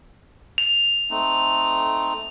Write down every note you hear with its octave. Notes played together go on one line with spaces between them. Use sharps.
F7
A3 C4 D#4